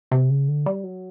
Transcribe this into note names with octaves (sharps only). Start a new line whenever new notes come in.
C3
C#3
D3
G3
F#3